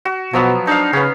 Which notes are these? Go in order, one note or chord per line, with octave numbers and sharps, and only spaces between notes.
F#4
B2 F3 F#3 B3
D4 D#4 F5
C#3 B3 C#4